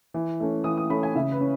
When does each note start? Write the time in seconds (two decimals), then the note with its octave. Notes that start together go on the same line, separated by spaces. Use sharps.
0.14 E3
0.40 A3 C#4
0.64 E3 D#6
0.77 D#6
0.90 A3 C#4 B5
1.03 G#5
1.15 C#3 E5
1.32 B4
1.40 C#4